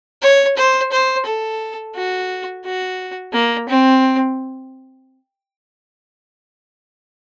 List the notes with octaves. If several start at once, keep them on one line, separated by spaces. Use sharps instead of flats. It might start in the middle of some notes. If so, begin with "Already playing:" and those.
C#5
C5
C5
A4
F#4
F#4
A#3
C4